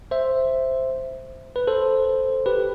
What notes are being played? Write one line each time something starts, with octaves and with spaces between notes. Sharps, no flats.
C5 E5
B4
A4 C5
G4 B4